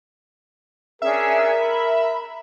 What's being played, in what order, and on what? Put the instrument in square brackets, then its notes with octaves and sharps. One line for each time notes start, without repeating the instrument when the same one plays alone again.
[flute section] C#4 D4 G#4 [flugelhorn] A#4 [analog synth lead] E5
[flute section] B5